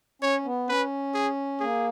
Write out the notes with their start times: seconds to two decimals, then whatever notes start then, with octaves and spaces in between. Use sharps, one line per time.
0.22 C#4 C#5
0.45 B3
0.68 C#4 B4
1.14 G#4
1.60 A#3 G#4